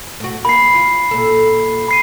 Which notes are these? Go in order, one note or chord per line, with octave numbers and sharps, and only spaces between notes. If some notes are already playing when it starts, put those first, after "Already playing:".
A2 F#4
A#3 B5 C7
F4
A#2 A4
B5 C7 D#7